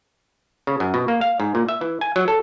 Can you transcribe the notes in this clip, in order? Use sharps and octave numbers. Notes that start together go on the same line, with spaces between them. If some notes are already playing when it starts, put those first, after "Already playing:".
C#3
F#2
B2
A#3
F5
G#2
A#2
E5
E3
G#5
F#3
A4